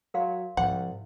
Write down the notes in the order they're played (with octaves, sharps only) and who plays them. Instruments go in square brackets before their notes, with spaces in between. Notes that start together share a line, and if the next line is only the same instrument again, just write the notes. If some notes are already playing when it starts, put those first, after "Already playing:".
[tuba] F#3 [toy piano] A#4 F5 C6
[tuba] C2 [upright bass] G#2 F3 [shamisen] F#5